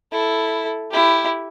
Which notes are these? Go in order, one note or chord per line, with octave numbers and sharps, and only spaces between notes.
E4 A4
E4 G4